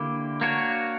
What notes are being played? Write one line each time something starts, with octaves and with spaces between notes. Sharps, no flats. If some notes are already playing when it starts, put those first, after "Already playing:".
Already playing: D3 A#3 E4 G4
A#3 D4 F#4 A#4 C#5